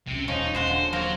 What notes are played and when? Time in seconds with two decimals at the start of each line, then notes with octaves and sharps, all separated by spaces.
0.07 C#2 C3 G3
0.28 D#1 D2 F3 C#4 D#4
0.55 D#1 G#3 F4 F#4 C5
0.67 D3
0.92 F#3 A#3 C4 A#4